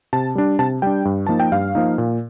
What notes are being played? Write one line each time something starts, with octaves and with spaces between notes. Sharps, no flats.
C3 A5
G3 D4
C3 A5
G3 D4 G5
G2
F3 A#3 D#4 A5
G5
G2 F5
F3 A#3 D#4
A#2